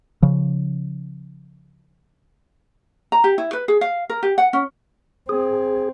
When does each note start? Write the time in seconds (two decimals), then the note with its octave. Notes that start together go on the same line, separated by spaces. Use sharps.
0.22 C#3 F3
3.12 A#5
3.24 G4
3.38 E4
3.53 B4
3.68 G#4
3.81 F5
4.10 A#4
4.23 G4
4.38 F#5
4.53 C#4
5.29 C4 G#4